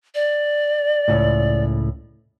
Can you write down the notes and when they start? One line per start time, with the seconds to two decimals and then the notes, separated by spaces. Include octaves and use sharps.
0.15 D5
1.08 C#2 A2